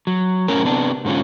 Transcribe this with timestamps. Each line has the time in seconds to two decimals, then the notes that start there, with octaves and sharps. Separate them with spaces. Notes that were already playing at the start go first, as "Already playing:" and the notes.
0.07 F#3
0.48 F#2 A2 C#4 A#4
0.64 C3 B3 D4
1.05 G#2 D3 C#4 F4